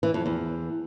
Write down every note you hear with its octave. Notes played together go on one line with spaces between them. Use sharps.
E3
F2
E2